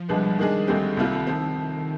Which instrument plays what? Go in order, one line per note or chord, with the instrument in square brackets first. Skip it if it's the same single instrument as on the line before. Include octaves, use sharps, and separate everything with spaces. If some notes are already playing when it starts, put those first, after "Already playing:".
Already playing: [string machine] F3
[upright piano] C2 B2 G#3 B3 D4 [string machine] G3
[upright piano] D#3 G#3 D4 G#4
[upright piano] D2 D3 G#3 C4 G4 [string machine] D#3
[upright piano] C2 C3 G3 C4 F4 [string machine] D#3
[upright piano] F3 C4